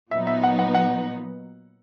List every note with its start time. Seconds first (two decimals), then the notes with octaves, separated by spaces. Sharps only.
0.11 A#2 F#3 B3 D#4 E5
0.27 E5
0.43 F#5
0.59 F#5
0.74 F#5